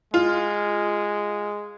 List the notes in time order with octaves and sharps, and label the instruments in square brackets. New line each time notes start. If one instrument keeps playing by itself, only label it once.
[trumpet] G#3 [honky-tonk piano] F4